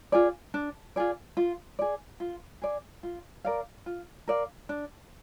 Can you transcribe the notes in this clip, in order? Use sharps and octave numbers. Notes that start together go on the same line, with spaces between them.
F4 G#4 D5
D4
F4 G#4 D5
F4
G#4 D5
F4
G#4 D5
F4
A#4 D5 F5
F4
A#4 D5 F5
D4